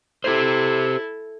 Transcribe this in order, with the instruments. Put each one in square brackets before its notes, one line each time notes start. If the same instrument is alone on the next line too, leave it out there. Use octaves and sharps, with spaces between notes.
[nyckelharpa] E4 A4 [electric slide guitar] G4 C5